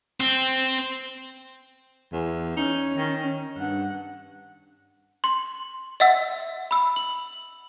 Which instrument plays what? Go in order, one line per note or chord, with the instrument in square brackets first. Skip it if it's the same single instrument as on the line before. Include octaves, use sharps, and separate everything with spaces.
[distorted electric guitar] C4
[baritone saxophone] E2
[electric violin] C#4 [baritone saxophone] D#4
[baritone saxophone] D#3
[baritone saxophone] G2 [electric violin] F#5
[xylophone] C6
D#5 E5 F#5 E6
B5 E6
F#7